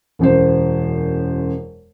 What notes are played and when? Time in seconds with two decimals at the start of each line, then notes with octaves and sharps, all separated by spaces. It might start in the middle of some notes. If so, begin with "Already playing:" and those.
0.19 E1 F#2 C5